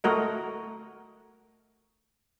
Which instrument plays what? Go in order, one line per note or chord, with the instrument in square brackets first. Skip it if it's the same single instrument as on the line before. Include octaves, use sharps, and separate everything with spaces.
[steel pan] A3 F#4 A#4 D#5